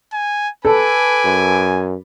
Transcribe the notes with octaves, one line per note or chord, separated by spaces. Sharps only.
G#5
A4 B4 G#5 D6
F#2